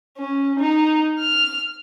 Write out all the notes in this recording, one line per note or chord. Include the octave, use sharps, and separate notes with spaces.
C#4
D#4
F6